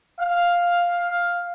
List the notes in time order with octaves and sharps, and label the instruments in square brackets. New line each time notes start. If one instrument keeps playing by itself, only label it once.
[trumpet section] F5